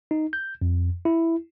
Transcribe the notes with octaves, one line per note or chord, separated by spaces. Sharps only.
D#4
G6
F2
E4